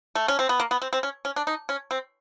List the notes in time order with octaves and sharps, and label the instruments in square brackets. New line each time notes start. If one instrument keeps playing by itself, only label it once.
[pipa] A3
C#4
C4
B3
A#3
B3
C4
C4
C#4
C#4
D4
D#4
C#4
C4